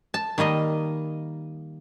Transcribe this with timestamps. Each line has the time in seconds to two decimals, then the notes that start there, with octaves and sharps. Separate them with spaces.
0.14 A5
0.38 D#3 G3 A#3 D#5